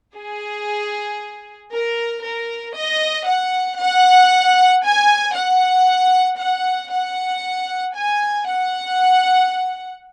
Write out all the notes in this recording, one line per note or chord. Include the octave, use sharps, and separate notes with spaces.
G#4
A#4
A#4
D#5
F#5
F#5
G#5
F#5
F#5
F#5
G#5
F#5